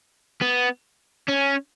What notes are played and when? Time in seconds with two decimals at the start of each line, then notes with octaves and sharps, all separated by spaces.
0.41 B3
1.28 C#4